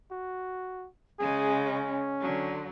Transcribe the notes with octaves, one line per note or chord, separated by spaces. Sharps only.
F#4
C#3 G#3 G#4
C#4
D3 F#3